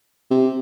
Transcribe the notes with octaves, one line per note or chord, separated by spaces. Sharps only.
C3